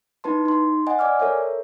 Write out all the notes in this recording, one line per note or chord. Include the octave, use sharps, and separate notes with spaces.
D#4 E4 B4 A5 C6
D#4 C6
D#5 F#5 G#5
D5 G#5 D6 F6
A4 A#4 C#5 E5